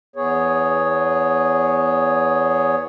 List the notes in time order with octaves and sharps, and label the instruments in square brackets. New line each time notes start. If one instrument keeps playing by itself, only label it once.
[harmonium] E2 B3 G#4 C#5